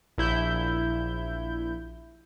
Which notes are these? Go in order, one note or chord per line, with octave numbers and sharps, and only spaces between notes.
A#1 E4 G6